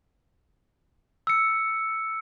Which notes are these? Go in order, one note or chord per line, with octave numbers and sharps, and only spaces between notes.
E6 C#7